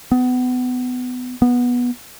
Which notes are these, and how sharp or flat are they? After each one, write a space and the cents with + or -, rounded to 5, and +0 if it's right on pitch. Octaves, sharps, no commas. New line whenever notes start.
B3 +25
B3 -15